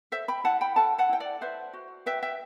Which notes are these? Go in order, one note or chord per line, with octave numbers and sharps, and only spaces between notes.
A4 C5 E5
G5 B5
E4 F#5 A5
G5 B5
A4 F#5 A5
F#5 A5
E4 G5
D5 F#5
B4 C5 E5
F#4
B4 E5 G5
E5 G5